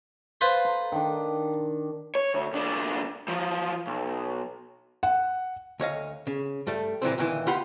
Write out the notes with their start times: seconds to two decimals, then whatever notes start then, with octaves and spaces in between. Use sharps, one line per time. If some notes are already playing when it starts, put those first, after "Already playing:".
0.41 F4 B4 C5
0.65 A#5
0.92 D#3 D4
2.15 C#5
2.34 D2
2.53 B1 D4
3.28 F3 F#3
3.87 B1
5.03 F#5
5.80 D2 C#5 D#5 F5
6.27 C#3
6.67 G2 G3 A3
7.02 A#2 E3 G3 C4
7.18 D2 A#2 D#3 E3
7.47 D#2 F4 G4 F#5 B5 C6